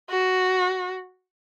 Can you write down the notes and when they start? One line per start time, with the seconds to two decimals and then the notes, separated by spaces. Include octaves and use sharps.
0.10 F#4